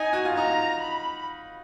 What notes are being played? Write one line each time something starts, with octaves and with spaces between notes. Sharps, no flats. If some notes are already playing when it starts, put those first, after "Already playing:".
Already playing: D#4 D#5 G#5
F#4
F4
D#4 A#5
F4
B5